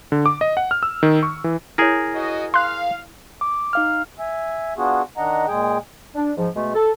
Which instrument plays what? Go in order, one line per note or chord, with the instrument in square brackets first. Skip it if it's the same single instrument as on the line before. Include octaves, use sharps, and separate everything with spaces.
[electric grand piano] D3
D6
D#5
F#5
F6
E6
D#3
C#6
E3
[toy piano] E4 C#5 [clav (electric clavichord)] G#4 A#4
[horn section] F#4 D#5
[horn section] F5 [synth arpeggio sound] C6 F#6
[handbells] D6
D#4 F5 F6
[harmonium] E5 G#5
B3 D4 F4 F#4 G#4
D#3 D4 D#5 F#5 A#5
A#2 G#3 G#4 G5
[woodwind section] D4
G#2 F3
B2 G#3 A3
A4